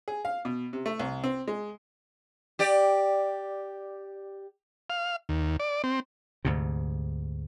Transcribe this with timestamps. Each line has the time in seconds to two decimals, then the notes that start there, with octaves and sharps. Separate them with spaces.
0.08 G#4
0.25 F5
0.45 B2
0.73 C3
0.86 A3
1.00 C2
1.24 C4
1.48 G#3
2.59 G4 D5
4.90 F5
5.29 D#2
5.60 D5
5.84 C4
6.45 D2 G#2 C3